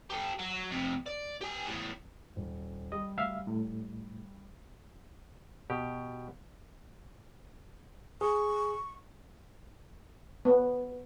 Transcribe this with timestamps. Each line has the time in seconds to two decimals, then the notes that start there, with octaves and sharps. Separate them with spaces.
0.10 G4 A4
0.39 F#3
0.71 F2 C3
1.06 D5
1.41 G4 G#5
1.66 E2 A2
2.36 D#1
2.92 G3 D#5
3.18 D2 E5 F5
3.47 A2
5.70 B2 G4
8.21 G#4 C#6
10.45 B3